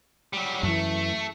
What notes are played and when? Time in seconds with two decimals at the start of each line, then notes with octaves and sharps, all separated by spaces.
0.33 F#3 G3
0.63 F#2 E3 A3